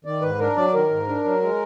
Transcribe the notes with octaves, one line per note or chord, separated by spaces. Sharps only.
D#3 D5
G#2 B4
D4 A#4
F#3 D5
D#3 A#4
G#2
D4
F#3
G#3